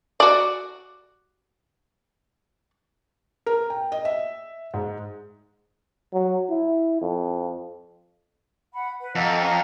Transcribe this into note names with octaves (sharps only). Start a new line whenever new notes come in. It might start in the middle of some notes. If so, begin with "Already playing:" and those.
F#4 D5
A#4
G5
D#5
E5
G#2
F#3
E4
F2
F#5 B5
B4
F2 D#5 F#5 A#5
C#4 A#5